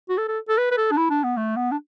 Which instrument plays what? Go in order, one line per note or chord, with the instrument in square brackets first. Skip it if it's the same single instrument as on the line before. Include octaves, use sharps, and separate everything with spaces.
[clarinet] F#4
A4
A4
A4
B4
B4
A4
D4
E4
D4
B3
A3
B3
D4